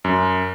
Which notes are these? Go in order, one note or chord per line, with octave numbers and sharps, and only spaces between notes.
F#2